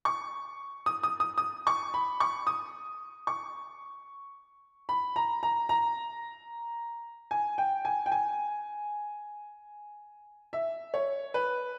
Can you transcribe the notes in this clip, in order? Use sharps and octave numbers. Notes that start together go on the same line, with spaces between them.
C#6
D#6
D#6
D#6
D#6
C#6
B5
C#6
D#6
C#6
B5
A#5
A#5
A#5
G#5
G5
G#5
G5
G#5
E5
C#5
B4